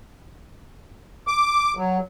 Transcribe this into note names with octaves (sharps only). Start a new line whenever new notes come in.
D6
F#3